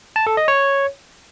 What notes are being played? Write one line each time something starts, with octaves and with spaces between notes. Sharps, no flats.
A5
A4
D#5
C#5